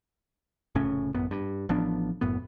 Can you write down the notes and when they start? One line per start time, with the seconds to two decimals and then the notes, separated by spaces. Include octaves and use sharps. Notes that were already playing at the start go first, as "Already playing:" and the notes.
0.75 F1 A2 C#3 C#4
1.14 A1 F#2 B3
1.31 G2
1.69 A1 F3 B3 D4
2.21 F#1 F#2 A2 B3